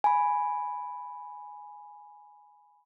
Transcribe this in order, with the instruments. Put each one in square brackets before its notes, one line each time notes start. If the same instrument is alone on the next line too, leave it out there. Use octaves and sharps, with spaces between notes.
[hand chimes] G#5 B5